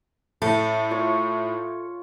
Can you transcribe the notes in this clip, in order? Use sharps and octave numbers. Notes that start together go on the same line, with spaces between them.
A2 A4
F4 C#5 C#6